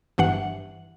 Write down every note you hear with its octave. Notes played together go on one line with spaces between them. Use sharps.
G1 G2 E3 F#5